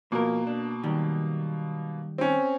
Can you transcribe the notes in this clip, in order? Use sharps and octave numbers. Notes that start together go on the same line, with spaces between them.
B2 F3 A#3 A#4
D4
D#3 F#3 G3
C4 C#4